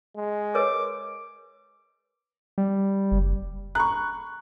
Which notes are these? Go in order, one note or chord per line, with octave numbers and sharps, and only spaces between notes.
G#3
A#4 B4 C#5 D6
G3
F#1
A#5 B5 C#6 F#6